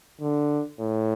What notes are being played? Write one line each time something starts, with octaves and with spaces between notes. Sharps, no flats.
D3
A2